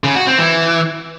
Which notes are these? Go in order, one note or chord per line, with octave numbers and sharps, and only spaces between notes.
C#3
F#4
C4
E3